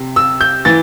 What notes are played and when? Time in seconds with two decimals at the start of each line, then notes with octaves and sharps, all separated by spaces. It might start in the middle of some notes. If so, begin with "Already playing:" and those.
Already playing: C3
0.16 E6
0.41 G6
0.65 E3 A6